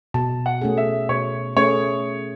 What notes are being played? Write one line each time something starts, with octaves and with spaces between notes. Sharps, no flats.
B2 A5
F#5
A3 C#4 G#4
E5
B2 C#5
A3 C#4 G#4 C#5